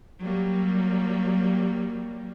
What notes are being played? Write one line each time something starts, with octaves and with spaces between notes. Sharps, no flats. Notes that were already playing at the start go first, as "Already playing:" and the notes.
F#3 G3 A#3